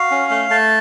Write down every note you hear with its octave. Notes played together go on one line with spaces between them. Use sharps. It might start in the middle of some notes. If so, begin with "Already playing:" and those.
Already playing: F#4 F5
C#4
A3
A3 A5